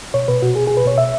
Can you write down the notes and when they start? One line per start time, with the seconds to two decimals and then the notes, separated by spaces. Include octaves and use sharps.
0.14 B2 C#5
0.28 B2 B4
0.42 B2 F#4
0.55 B2 G#4
0.67 B2 G#4
0.77 B4
0.85 B2 C#5
0.98 E5